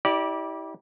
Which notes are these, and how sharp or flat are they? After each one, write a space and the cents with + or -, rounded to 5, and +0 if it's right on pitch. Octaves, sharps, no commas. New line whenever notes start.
E4 -35 G4 -15 D5 +0